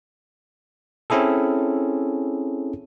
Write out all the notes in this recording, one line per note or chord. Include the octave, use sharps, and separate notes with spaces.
C4 C#4 E4 G#4 A4